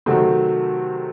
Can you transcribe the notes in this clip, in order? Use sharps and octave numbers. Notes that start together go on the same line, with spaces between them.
C3 D#3 F#3 A3 C4